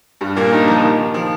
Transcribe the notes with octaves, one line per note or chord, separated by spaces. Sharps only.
G2 G3
A#2 A#3
G2 G3 D#4
F3
D#3
D#3
F3